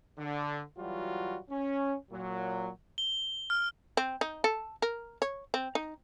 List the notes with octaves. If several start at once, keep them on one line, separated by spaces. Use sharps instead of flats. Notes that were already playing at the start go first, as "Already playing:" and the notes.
D3
E3 F#3 G3 F4 F#4
C#4
A#2 F#3
G7
F6
C4
D#4
A4
A#4
C#5
C4
D#4